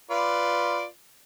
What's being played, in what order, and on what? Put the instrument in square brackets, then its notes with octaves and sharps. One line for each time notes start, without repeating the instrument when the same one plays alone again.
[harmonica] F4 B4 D5